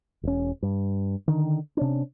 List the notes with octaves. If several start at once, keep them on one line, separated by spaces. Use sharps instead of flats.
E1 C#4
G2
D3 D#3
C3 C#4 D4